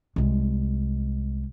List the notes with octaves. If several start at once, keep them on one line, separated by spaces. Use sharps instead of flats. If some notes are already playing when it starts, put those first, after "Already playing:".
C2 G#3